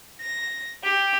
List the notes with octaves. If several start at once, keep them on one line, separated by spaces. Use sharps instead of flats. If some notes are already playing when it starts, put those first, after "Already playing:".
A#6
G4